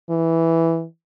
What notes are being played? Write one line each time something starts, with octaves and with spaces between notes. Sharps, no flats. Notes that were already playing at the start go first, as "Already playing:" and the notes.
E3